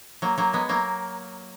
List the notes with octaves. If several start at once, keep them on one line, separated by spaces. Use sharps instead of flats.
F#3 A#3
F#3 A#3
G#3 B3
F#3 A#3